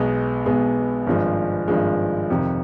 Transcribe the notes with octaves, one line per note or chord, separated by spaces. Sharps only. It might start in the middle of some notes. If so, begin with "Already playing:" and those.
Already playing: B1 B2 G#3 B3
B1 B2 G#3 B3
G#1 G2 F3 G#3
G#1 G2 F3 G#3
F2 C3 D#3